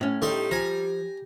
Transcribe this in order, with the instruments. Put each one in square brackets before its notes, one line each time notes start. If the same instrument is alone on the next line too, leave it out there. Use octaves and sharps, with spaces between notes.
[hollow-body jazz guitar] A2 C#4
[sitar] G3 [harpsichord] A3 D#4 C6
[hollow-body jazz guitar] F3 [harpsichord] G#5 A#5